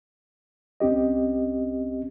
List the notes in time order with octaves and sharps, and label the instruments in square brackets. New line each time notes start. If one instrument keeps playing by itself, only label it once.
[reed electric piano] C2 C4 C#4 G4 D#5